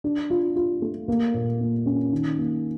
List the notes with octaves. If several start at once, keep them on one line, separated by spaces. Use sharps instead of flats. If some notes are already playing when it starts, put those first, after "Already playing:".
D4
F4
F4
A3
A#3
A#2
A#3
C#4
D#3
A#3